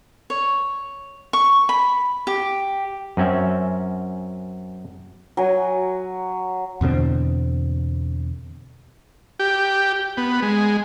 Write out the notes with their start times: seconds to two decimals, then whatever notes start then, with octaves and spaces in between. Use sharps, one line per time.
0.30 C#5
1.33 C#6
1.69 B5
2.27 G4
3.17 F#2 C4 C#4 E5
5.37 F#3 G#5
6.81 E2 B2 D3 C4
9.39 G4
10.17 B3
10.42 G#3